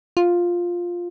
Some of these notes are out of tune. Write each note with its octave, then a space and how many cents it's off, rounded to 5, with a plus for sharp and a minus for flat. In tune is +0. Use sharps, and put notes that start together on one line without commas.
F4 +5